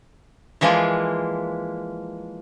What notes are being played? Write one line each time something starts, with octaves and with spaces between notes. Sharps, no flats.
E3 F3 G#3 A#3 F4